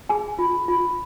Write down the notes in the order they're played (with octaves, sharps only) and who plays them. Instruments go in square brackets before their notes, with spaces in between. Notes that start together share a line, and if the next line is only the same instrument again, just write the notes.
[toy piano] G#4 G#5
F4
F4